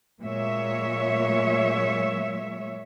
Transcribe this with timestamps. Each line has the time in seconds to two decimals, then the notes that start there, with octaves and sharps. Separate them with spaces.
0.23 A#2 F#3 G#3 C#5 E5